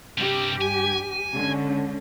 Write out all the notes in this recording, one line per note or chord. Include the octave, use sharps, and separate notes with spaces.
G2 C3 G3 G4
G#5
D3 G#3 C#4